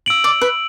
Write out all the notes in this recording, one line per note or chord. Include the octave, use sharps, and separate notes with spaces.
E6 D7 F#7
D5
B4